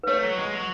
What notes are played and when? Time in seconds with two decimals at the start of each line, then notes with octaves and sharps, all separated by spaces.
0.03 B4
0.07 A3 C#5
0.23 F#3
0.38 G#3
0.52 F#3